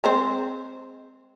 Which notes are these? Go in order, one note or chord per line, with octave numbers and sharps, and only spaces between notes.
G#3 C4 C5